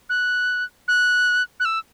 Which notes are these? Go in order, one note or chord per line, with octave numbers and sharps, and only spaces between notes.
F#6
F#6
F#6
E6